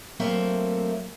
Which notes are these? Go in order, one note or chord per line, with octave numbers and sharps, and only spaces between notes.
F#3 A3 A#3 C4 C5 E5